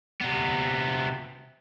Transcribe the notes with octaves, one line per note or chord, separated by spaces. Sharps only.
C3 B3